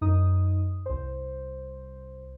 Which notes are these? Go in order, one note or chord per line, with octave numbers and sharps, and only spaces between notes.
F#2 D#4 D#6
C2 C5